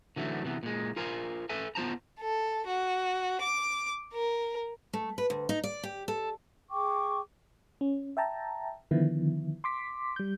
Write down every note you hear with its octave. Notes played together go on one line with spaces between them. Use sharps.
D3 E3 F#3 A3
C3 E3 B3
A#2 G#3
F4 A#4 C5 F5 G#5
A4 B4 E5 G#5
B3 F4 C5 A5 A#5
A4
F#4
D6
A#4
A3
B4
D2
D#4
D5
G4
A4
G#4 G5 C#6 D6
C#4
E5 G5 A5 A#5
D3 D#3 F3 B3 E4
C6 D6 B6
G3 G6